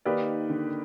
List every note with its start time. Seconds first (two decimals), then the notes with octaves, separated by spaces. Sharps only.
0.05 D#3 A#3 D#4 G4 B4 D5
0.50 D3